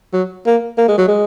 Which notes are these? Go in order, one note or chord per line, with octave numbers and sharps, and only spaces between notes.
F#3
A#3
A#3
G#3
F#3
G#3